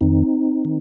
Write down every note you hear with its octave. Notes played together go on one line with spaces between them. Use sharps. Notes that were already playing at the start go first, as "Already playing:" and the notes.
F2 D#3 C4 D#4
D#3